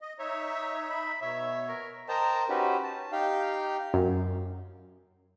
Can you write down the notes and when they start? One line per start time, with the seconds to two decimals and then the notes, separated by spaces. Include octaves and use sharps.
0.01 D#5
0.19 D#4 C#5 E5
0.90 B5
1.22 B2 C#5 E5
1.69 A#4
2.09 A#4 C5 D#5 G5 A5 A#5
2.49 C#4 D#4 F#4 G4 B4 C5
2.83 A5
3.12 D#4 G4 F5 G5
3.94 F#2